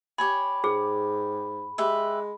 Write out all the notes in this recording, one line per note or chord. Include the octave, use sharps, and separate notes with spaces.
G4 C#5 G#5 B5
G#2 G#4
G#3 G4 B4 E5